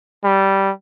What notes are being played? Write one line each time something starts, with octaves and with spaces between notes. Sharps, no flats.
G3